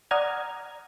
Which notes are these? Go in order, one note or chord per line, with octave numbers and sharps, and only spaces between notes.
D5 F#5 A#5 D#6 F6 G#6